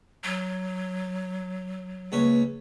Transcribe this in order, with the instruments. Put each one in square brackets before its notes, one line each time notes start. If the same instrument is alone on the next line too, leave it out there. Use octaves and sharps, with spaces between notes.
[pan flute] F#3
[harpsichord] C#2 B4 C#5 [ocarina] A#3